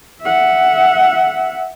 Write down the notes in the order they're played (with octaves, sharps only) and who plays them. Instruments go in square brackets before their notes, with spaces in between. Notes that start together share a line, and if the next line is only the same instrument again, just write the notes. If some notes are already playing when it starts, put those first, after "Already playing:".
[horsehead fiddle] E5 F#5